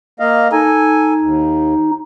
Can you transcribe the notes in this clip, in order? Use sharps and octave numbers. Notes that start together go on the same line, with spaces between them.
A#3 D#5 F5
D#4 A4 G#5
D#2